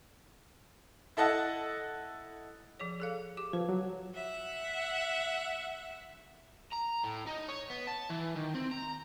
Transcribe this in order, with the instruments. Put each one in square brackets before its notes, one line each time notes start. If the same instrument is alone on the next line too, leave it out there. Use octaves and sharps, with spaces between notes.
[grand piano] E4 A4 D#5 F#5 A5
[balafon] F3 G#4 C#5
G#4 A4 F5
G4 D6
[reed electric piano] F3 [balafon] B4
[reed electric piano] F#3
[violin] E5 F#5
[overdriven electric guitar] A#5
A2
D#4
C#5
B3
A5
E3
D#3
C4
A#5